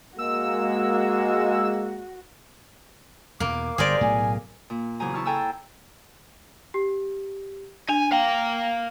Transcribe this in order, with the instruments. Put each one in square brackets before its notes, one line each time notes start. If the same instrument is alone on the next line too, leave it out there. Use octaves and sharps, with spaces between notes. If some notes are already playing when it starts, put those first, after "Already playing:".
[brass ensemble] G#3 A#3 [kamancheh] F#4 [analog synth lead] E6
[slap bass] E2 B2 [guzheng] A#3 [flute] D6
[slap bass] G1 [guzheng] G#4 A#4 D5 [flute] C5
[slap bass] B1 A2 A3 [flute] G#5
[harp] A#2
E2 C#3 F#3 C5 G#5 A#5
E4 A5 C#6 E6 F6
A4 C5 G5 G#5 A#5 E6
[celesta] G4
[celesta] D4 F7 [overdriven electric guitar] G#5
[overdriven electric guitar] A#4 F5 [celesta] G5